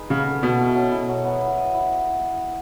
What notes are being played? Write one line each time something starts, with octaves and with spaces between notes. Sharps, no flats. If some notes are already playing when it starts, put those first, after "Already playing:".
Already playing: D#4 G#4 B4
C#3 B3
A4
B2 B3
E4
F#3
E4
F#3
B3
E4
D#5
E4